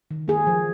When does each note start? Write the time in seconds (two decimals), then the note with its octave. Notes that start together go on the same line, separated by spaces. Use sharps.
0.11 D#3
0.28 A#3 G#4
0.47 F3